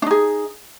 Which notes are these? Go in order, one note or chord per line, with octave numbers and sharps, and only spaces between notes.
D4 D#4 G#4